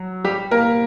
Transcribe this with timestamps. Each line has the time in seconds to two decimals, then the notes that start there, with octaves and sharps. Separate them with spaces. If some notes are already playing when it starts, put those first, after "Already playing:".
Already playing: F#3
0.24 G3 G4
0.51 A#3 A#4